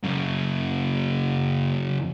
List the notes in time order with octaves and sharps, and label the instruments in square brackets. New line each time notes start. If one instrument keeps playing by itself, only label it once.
[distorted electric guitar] F#2 C#3